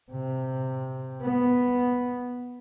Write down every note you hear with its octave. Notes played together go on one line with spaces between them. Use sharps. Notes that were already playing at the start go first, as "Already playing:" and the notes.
C3
B3